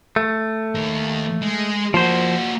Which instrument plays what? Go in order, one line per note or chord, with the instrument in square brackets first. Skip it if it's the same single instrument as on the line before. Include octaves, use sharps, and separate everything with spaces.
[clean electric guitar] A3
[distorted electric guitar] D#2 D#3
G#3
[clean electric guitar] F3 C5 [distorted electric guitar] A#3 F#4